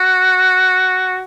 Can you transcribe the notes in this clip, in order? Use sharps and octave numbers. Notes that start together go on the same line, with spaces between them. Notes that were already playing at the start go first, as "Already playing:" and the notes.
Already playing: F#4